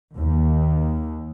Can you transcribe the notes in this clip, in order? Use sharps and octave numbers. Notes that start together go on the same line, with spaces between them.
D#2